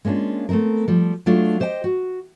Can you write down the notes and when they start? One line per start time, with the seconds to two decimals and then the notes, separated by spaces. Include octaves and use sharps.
0.05 G#3 A#3 C#4 D4 F4
0.49 A3 B3 C4 D#4 A#4
0.88 F3 G3
1.26 F#3 A3 D4 F4
1.60 G4 C5 D#5 E5 G5
1.84 F#4